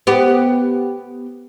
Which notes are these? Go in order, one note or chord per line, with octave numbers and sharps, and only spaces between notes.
B3 G4